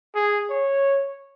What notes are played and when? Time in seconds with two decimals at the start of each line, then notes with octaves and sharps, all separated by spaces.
0.15 G#4
0.50 C#5